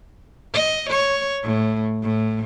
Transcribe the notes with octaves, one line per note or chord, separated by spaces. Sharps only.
D#5
C#5
A2
A2